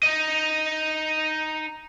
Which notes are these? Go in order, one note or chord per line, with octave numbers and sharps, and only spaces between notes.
D#4 D#5